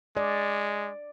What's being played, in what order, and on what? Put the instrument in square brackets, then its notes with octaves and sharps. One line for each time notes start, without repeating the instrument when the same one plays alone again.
[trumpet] G#3 [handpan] D5